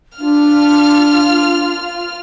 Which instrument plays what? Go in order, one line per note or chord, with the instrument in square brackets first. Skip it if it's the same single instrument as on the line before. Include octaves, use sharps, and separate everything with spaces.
[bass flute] D4 [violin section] F4 F6